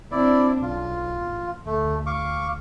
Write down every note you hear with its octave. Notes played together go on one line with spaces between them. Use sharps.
C4 D4 E4 D5
B1 F4
A1
D2 A3
F5 C#6 D6